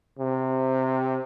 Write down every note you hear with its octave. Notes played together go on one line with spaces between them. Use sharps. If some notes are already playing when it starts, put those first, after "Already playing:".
C3